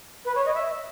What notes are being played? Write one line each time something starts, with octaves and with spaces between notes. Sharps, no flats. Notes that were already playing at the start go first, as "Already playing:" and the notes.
B4
C#5
D#5
E5